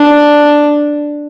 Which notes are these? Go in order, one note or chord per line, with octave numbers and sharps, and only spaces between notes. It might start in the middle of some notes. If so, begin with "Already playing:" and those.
Already playing: D4